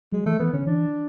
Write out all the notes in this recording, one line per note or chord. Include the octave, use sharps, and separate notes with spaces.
F#3 G#3
E3 A3
E3 B3
D3 C#4
E3 D4